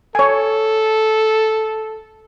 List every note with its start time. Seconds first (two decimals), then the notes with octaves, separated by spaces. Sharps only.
0.15 A4 C#5 G#5